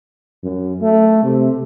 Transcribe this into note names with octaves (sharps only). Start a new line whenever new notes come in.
F#2
A3
C3